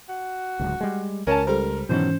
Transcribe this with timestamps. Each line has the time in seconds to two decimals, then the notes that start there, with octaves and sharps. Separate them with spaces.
0.09 F#4
0.60 D1 C#2
0.81 G3 G#3
1.27 C#2 C#4 A#4 A5
1.47 G3 A4 A#4 C5
1.89 G#2 B2 D#3 E3 F#3 C#4 C5